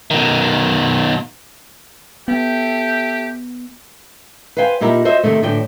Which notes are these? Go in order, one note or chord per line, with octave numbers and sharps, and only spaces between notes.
B2 D#3
B3 G4 A4 E5 G5
B4 C5 F5 G5 G#5
A#2 D#4 E4 G4 A#4
F#4 C5 D#5 E5
C3 D#3 A3
A2 D3 E3 G5